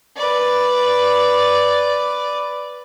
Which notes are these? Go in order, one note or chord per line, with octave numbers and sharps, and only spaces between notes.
B4 D5